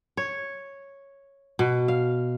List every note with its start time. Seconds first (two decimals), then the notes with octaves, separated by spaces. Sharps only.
0.17 C#5
1.59 B2
1.88 F5